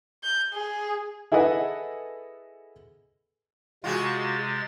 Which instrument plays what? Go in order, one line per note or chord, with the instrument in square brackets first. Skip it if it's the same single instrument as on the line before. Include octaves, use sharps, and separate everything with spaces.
[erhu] G6
G#4
[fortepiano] E4 G#4 A4 B4 D#5 F#5
[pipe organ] C3 G#3 A6 [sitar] F4 F#4 G#4